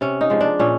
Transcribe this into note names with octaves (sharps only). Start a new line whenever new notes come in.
C3 C#4
D#4
F3 G#3
D4
A#2 C#4